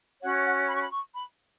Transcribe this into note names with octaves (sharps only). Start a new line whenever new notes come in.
C#4 F#4 C#5 F#5
F#5
B5
C#6
B5
C#6
B5